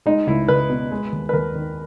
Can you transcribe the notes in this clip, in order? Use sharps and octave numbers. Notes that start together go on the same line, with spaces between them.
G#3 D#4
C#2 E4
C#2 B4
B2
G#3
D#2
B4
D#2 A#4
D#3